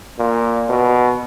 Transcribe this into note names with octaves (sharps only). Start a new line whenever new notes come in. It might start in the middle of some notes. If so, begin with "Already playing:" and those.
A#2
B2